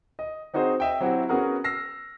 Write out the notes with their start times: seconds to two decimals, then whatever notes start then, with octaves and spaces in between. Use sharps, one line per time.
0.19 D#5
0.54 C4 D#4 F#4 G#4 C5
0.80 D#5 E5 G5
1.01 F#3 C4 E4 F#4 G4
1.29 B3 C#4 F#4 G#4 A#4 F#5
1.64 E6 F6 A#6 C7